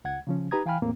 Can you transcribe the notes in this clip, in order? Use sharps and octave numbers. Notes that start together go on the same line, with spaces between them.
C#2 F#5 G#6
C#3 F3 C#4
D#4 G4 B4 A#5 D#6 G#6
E3 F5 G5 G#5 B5 F6
E2 A2 A#3 C4